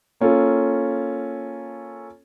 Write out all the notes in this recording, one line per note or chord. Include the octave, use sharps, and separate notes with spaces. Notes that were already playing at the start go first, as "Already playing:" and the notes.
A#3 C#4 F4 A4